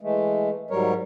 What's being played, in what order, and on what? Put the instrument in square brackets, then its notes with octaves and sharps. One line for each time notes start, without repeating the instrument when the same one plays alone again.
[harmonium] E3 G#3 A3
G#2 F#3 G3 A#4 C#5